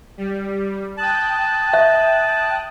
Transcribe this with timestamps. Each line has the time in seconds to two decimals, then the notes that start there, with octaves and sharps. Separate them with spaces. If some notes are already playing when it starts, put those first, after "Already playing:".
0.18 G3
0.97 G5 A5 D#6 F#6
1.73 E5